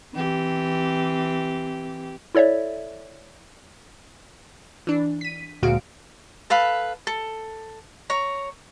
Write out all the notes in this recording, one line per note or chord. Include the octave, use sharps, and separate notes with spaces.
E3 C4 G4
E4 A4 C#5 D5 E5
E3 D4
B6 D#7
D2 A#2 G#3 F#4 F5 D7
A4 B4 F5 B5
A4
C#5 A#5